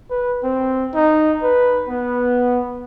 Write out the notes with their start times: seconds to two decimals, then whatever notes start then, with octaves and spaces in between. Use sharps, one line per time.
0.10 B4
0.43 C4
0.95 D#4
1.43 B4
1.89 B3